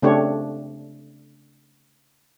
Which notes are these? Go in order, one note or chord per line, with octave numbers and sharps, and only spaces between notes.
C#3 A3 C4 D4 G4 C#5